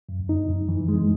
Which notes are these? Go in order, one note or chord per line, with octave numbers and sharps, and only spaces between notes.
F#2
D#4
F#2
E3
G#3